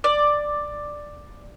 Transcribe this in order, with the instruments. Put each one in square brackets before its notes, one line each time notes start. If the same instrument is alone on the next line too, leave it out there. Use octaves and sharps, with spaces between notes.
[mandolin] D5